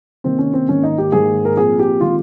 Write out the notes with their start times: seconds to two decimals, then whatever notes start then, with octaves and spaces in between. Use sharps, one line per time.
0.24 C3 D#3 A#3 C4
0.38 C#4
0.53 C4
0.68 G#2 D#3 A#3 C#4
0.83 D#4
0.98 G4
1.12 G#2 D#3 A#3 G#4
1.45 A#4
1.57 A#2 F3 C4 G#4
1.79 G4
2.01 D#3 G#3 C4 F4